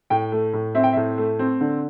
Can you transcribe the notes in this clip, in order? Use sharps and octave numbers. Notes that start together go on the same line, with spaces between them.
A2 G5
A3
A2
C4 E5
G5
A2 E5
A3
C4
D3